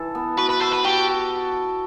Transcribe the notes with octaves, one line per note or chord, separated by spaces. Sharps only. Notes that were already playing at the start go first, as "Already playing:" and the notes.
Already playing: E3 A4
B3
F#4 B4
B4
A4 C5
B4
F#4 G4